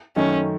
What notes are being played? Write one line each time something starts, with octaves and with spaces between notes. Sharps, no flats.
F#2 D#3 A3 C#4 D#4